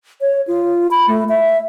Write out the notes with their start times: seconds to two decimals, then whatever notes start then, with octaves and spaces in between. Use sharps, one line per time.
0.21 C#5
0.48 F4
0.91 B5
1.08 A3
1.29 E5